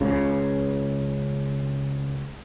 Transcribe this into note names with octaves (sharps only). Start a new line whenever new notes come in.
C#2 C#3